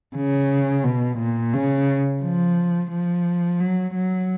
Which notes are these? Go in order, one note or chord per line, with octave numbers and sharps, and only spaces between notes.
C#3
B2
A#2
C#3
F3
F3
F#3
F#3